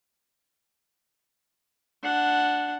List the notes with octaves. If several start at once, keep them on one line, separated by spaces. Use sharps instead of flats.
D4 F#5